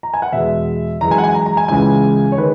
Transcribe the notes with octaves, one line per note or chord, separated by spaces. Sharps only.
A#5
G#5
F#5
E2 B2 G#3 E5
F#2 E3 G#3 A#5
G#5
F#5
G#5
A#5
A#5
G#5
C#2 C#3 E3 G#3 G#5
C#5
D#3 G#3 B4